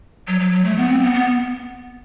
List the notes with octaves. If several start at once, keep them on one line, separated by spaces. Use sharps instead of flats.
F#3
F#3
F#3
A3
B3
C4
B3
B3